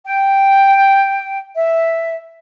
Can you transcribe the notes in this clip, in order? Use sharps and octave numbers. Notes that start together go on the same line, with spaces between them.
G5
E5